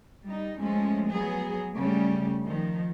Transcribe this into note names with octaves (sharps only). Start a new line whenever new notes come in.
G3 D#4
F3 G#3 A3 C#4
F#3 B3 G#4
C#3 G3 A3 C#4
D#3 F3